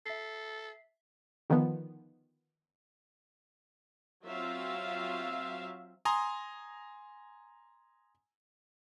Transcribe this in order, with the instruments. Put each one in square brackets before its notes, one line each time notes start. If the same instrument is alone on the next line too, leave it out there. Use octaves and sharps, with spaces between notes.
[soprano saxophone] A4 [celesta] E5 B6 C7
[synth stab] D3 D#3 F3 B3
[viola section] F#3 C4 F4 E5 F5
[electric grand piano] G#5 A#5 C6 D#6 A#6